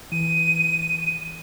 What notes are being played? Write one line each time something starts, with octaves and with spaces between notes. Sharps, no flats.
E3 D#7